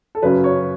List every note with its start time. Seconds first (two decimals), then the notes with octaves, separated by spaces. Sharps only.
0.15 A4
0.23 F#2 C#3 F#3 B4
0.44 C#5